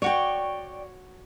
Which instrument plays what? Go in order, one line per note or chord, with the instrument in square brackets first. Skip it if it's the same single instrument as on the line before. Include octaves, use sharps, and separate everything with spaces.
[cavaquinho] F#4 C#5 [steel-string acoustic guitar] D5 G5